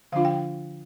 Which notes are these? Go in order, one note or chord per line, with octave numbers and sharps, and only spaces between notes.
D3 F3 D4 F4 F5
G5